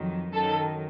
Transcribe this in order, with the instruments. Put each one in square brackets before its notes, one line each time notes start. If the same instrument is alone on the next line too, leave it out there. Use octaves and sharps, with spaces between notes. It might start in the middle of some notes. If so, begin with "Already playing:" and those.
Already playing: [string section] F2 D#3 F#3
F#2 D#3 F#3 A4